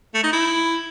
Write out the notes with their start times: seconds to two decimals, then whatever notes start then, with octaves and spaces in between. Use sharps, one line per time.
0.14 A3
0.23 D#4
0.33 E4